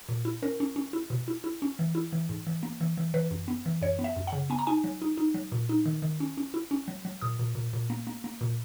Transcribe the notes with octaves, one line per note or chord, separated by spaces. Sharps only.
A#2
E4
C#4 A#4
C#4
C#4
E4
B2
E4
E4
C#4
E3
E4
E3
G#2
E3
A#3
E3
E3
E3 B4
F#2
B3
E3
F#2 C#5
B3
E5
F#2
F#5
C#3
B3 G#5
A#5
D#4 G#5
F#3
D#4
D#4
F#3
A#2
D#4
D#3
D#3
C#4
C#4
E4
C#4
F#3
F#3
A#2 D#6
A#2
A#2
A#2
A#3
A#3
A#3
A#2